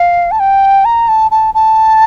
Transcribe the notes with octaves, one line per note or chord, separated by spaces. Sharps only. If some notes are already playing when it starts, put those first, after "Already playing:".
Already playing: F5
A5
G5
A#5
A5
A5
A5